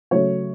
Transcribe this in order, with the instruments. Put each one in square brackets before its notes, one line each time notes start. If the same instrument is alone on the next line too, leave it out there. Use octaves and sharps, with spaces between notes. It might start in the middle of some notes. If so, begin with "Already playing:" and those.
[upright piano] C#3 F#3 A3 C#5